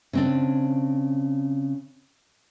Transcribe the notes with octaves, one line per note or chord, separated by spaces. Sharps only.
C#3 C4 D4